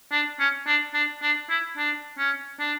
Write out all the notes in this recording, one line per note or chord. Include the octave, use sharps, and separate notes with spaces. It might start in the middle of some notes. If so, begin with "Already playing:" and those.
D4
C#4
D4
D4
D4
E4
D4
C#4
D4